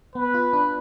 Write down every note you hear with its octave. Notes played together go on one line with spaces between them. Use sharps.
B3 B4
F4
D4